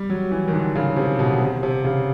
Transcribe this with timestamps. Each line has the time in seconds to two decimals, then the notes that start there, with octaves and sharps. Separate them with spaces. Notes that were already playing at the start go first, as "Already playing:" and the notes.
Already playing: G3
0.10 F#3
0.31 E3
0.48 D#3
0.53 D3
0.75 C#3
0.96 C3
1.19 B2
1.41 C3
1.63 C3
1.84 C#3